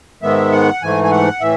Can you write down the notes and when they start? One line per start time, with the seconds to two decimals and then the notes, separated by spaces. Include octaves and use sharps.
0.23 G#2 D#3 G#3 B3 E5
0.52 F#5
0.82 G#2 E3 A3 G#5
1.04 G#5
1.11 F#5
1.41 A2 E3 E5